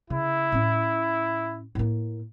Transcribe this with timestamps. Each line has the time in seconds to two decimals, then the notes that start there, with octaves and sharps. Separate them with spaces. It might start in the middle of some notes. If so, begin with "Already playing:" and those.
0.10 C#3 E4
0.52 A2 C#4
1.75 A2 A#3